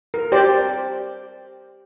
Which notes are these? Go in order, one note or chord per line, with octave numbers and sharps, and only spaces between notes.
A#4
G4 C5 D5